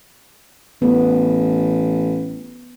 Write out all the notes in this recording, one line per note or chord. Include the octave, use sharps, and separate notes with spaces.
A1 B3